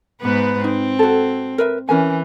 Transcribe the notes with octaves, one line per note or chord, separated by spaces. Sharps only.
G#2 B3 B4
C4 D#4
F#4 A4
A#4 B4 E5
E3 C#4 A#4 G#5